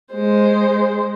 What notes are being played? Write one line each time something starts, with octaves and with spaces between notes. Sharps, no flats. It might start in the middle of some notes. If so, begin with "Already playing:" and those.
G#3 C5